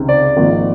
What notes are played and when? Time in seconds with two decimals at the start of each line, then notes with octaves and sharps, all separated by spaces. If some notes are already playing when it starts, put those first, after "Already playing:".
Already playing: C#2 C3 D#3
0.09 D5
0.37 G#1 G#2 F3 A#3 D#4